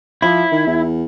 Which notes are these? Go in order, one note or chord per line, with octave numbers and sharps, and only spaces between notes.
F3 E4
D#3
E2